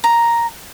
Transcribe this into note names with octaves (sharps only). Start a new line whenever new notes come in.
A#5